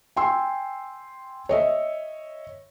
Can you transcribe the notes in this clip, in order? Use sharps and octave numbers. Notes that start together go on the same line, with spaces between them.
G5 G#5 C6 E6
C#5 D#5 E5